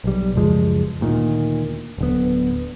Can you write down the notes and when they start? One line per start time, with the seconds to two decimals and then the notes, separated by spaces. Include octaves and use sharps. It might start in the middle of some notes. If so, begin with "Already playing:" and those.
0.04 B1 G3
0.36 F#1 C#2 F3 G#3
1.01 D2 A#2 D#3
1.98 D1 D3 B3